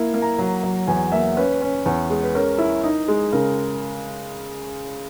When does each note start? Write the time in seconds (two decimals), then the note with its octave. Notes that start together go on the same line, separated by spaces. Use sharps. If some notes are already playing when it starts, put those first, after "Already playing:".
Already playing: A#3 E4
0.14 A#3
0.22 A#5
0.38 F#3
0.63 F#3
0.87 E2 G#5
1.12 A#3 E5
1.37 C#4 B4
1.61 C#4
1.86 E2
2.10 G#3
2.23 B4
2.35 C#4 A#4
2.58 E4
2.83 D#4
3.08 G#3
3.32 C#3 A#4